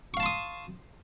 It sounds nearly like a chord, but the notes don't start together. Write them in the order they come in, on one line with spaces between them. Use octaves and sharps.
C#6 F5 A5 C6 D#6